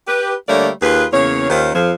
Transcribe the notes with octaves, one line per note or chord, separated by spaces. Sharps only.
G4 B4
D3 G3 A3 A#3 C#5 D5
D#2 F4 G#4 B4
E2 C#3 A#3 C#5
D#2 D#3 C#4 F4 C5
F2 F3